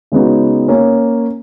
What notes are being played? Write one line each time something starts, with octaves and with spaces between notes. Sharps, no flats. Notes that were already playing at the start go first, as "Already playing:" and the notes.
C#3 G#3 B3 D#4 F#4
A#3 C#4